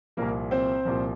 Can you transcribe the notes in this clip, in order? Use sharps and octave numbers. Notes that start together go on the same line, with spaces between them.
C2 A#2 F3 A#3 A#4
C4 C5
C2 A#2 F3